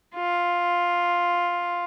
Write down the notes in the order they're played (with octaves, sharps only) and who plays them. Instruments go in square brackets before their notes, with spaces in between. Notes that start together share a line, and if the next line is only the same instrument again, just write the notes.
[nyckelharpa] F4